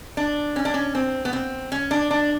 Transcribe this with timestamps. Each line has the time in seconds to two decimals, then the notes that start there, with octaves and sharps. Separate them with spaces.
0.17 D4
0.56 C#4
0.65 D4
0.74 C#4
0.95 C4
1.25 B3
1.33 C4
1.72 C#4
1.91 D4
2.11 D4